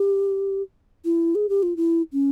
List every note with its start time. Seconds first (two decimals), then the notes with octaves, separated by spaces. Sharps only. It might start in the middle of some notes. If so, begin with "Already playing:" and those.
Already playing: G4
1.05 E4
1.35 G#4
1.49 G4
1.63 F4
1.77 E4
2.13 C#4